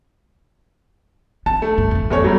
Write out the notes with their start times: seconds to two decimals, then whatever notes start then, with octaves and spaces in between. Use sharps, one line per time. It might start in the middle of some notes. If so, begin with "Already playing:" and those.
1.46 B3 D4 A5
1.62 A3
1.78 G2
1.91 F2 C3
2.10 F#1 E2 A3 C#5
2.24 F#3 G3 A3